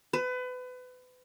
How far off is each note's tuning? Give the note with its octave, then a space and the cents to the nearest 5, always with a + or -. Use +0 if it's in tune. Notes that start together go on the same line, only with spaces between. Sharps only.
B4 +30